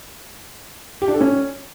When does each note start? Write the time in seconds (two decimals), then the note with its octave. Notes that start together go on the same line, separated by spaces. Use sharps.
1.02 G4
1.08 D4
1.14 A4
1.21 C#4